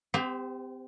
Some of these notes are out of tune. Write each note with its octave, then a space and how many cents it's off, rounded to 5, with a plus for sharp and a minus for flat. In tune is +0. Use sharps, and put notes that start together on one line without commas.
C4 -35 G4 +20 C5 +0